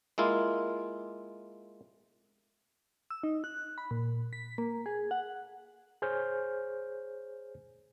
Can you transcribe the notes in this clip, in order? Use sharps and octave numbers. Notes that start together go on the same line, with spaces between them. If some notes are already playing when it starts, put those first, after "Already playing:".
G#3 A#3 E4 F4
E6
D#4
F#6
B5
A#2
B6
A#3
G#4
F#5
G#4 C5 C#5 G#5 F6 G6